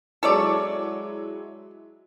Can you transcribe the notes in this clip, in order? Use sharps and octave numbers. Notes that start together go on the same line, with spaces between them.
F#3 G#3 E4 A4 C#5 D5